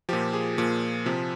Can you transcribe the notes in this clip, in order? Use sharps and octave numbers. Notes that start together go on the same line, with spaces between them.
A#2 F3 G4
G#4
A#2 F3
C3 F3